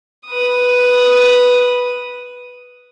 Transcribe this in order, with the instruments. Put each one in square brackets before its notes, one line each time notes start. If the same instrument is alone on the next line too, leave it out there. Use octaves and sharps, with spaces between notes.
[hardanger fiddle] B4 D#6